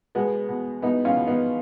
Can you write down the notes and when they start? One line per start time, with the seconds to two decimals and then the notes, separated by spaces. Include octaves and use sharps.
0.15 B2 G#3 B3
0.49 B2
0.82 B2 B3 D#4
1.05 C#4 F4
1.16 B2
1.27 B3 D#4